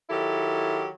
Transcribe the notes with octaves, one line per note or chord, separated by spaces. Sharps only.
D#3 F#3 E4 G4 A4